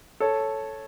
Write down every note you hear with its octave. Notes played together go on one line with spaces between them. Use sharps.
A4 C#5